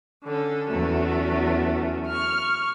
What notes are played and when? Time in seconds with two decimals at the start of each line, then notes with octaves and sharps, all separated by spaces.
0.25 D3 C#4 A4
0.69 E2 F#3 A3 C#4
2.06 C#6 F6